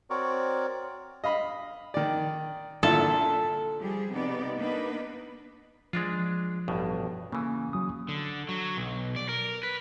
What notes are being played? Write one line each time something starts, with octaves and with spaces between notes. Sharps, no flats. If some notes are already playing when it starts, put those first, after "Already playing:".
C4 F#4 A#4 C#5 D5
D#5 F5 B5
D#3 D5
A#2 D3 E4 A4
F3 G3 G4 G#4
C3 B3 D#4 D5
A#3 B3 D4 D#4 B4
F3 G#3 D4 F4
A1 G2 B2
C#3 E3 A#3
F#3 D#6
D3
F#3
B1
D5
A#4
B4